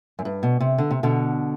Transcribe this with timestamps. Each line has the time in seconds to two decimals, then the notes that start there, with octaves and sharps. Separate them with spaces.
0.19 F#2
0.25 G2
0.43 B2
0.60 C3
0.78 D3
0.91 C3
1.03 B2 D3